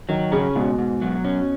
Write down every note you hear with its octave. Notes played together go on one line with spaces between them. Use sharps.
D#3 F#3
C#3 C#4
G#2 B2
G#2
F#3
C#4